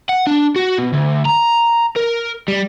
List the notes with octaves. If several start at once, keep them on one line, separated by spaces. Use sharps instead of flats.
F#5
D4
F#4
B2
D2
A#5
A#4
G3